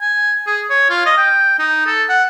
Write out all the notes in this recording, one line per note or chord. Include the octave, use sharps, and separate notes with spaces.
G#5
G#4
C#5
F4
D#5
G5
D#4
A4
F#5